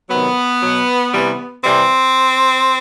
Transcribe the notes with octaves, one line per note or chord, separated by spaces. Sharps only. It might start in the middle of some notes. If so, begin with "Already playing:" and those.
C3 D#3 F#3 B3
B2 F#3
C3 E3 G3
C3 E3 G3 C4